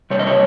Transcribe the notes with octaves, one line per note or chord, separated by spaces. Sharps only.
C3 G3 C#5
D#5
C#5